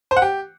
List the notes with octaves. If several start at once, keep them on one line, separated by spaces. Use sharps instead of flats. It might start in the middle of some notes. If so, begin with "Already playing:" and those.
C5
F#5
G4